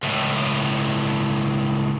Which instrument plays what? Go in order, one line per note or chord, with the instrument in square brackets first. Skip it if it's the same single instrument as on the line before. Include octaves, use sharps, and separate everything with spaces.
[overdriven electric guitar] C#2 A2